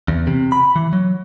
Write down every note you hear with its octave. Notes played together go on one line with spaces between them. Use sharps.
E2
C3
B5
E3
F#3